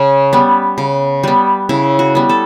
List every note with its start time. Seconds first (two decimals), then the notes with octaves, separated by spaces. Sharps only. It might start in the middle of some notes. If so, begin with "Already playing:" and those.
Already playing: C#3 C#4
0.33 G3 B3
0.78 C#3
1.23 G3 B3
1.69 C#3 E4
1.99 F#4
2.15 G3 B3
2.29 A4